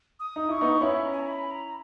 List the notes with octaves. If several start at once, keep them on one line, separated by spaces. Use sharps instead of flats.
D#6
D#4
E4 C#6
B3 D#4
C#4 E4 B5
A#5
G#5
A#5
B5
A#5